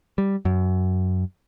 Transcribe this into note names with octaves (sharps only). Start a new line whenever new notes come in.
G3
F#2